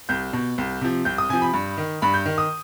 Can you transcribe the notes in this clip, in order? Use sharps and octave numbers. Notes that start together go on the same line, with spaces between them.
C2 G6
B2
C2
C3 F3
C2 G6
D#6
C3 F3 G#5
B5
G2
D#3
G2 B5
G6
D#3
D#6